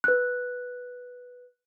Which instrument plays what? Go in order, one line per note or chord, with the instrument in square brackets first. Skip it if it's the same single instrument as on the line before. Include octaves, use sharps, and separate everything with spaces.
[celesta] B4 F#6